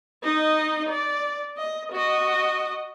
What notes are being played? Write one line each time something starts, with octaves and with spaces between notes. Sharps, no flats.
D#4 D#5
D5
D#5
F#4 D#5